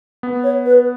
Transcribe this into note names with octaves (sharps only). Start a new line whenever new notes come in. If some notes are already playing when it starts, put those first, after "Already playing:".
B3
C#5
B4